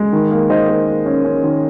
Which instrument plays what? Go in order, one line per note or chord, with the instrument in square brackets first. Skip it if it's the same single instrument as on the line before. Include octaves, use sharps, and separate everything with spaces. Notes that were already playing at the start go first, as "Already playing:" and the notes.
Already playing: [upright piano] G#3
D#3
A#3
D#3 C5 D#5
A#3
A#3
C#4
C#4
D#3